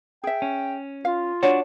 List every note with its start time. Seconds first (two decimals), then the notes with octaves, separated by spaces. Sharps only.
0.24 G#4 E5 G5
0.42 C#4
1.05 F4 F5
1.43 D4 F#4 C#5